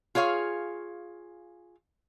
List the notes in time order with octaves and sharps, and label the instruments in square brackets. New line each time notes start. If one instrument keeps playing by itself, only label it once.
[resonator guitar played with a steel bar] F4 G#4 C#5 F5